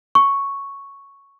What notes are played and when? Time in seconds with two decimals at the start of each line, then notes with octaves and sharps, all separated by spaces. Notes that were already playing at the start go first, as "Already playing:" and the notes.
0.15 C#6